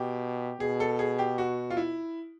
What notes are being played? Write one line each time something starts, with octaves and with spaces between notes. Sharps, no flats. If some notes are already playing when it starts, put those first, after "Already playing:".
Already playing: B2 G4
B2 G#4
A4
G#4
G4
F#4
F4
E4